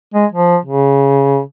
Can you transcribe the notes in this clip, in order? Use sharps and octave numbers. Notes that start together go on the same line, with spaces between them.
G#3
F3
C#3